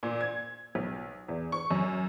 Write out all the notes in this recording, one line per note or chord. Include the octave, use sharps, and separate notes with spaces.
A#2
G#6
B1
E2
C#6
F#2